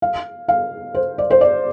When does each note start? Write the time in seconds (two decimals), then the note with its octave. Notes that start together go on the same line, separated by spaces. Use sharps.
0.02 F5
0.48 F5
0.95 C5
1.18 D5
1.30 C5
1.41 D5